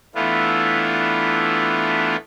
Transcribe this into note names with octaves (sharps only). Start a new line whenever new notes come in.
E3 A3 B3 D4 E4 F4